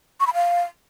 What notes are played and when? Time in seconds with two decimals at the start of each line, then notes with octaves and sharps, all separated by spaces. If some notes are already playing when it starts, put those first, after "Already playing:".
0.20 C#6
0.27 B5
0.34 F5